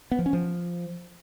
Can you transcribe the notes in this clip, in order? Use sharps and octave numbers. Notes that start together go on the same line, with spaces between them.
B3
F3
C#4
F3